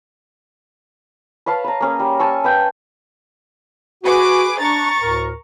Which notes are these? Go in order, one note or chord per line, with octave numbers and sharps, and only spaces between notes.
B4 C#5 F5 A5
B4 A#5
A#3 C#4 G#4
G3
G#5 A5 C#6 E6
B4 F5 G5
F#4 G#4 B4 D6
D4 A#5 C#6 A6
D2 A2 A#4